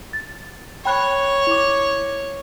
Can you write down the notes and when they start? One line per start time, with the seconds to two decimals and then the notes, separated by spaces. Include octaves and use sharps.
0.13 A6
0.85 C#5 G5 B5 F#6
1.47 E4 D6